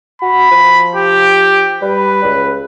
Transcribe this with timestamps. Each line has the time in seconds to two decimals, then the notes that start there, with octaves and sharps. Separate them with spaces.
0.22 F#4 B5
0.51 F3
0.95 G4
1.82 G3 B4
2.24 C#2